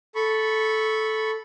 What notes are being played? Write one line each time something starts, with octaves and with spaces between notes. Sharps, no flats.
A4 B5 C#6